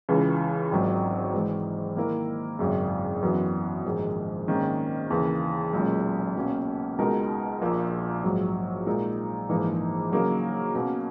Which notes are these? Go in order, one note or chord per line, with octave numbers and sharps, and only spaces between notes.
C#2 C#3 E3
G#1 G#2 D#3 F#3
G#2 E3 G#3
D#3 A#3 E4 A#4
G#1 F#2 C#3
F#2 E3 B3 F#4
A#1 G#2 D#3 G#3
G#1 G#2 D#3 A#3 C#4
D#2 C#3 E3
B1 A#2 G#3 C#4
B1 B2 A#3 C#4
C#2 B2 G#3 D#4 A#4
A#1 A#2 A#3
A#1 G#2 F#3
A#2 G#3 D#4 A#4
A#1 G#2 E3 A#3 D#4
C#3 F#3 A#3 D#4 A#4
B2 A#3 C#4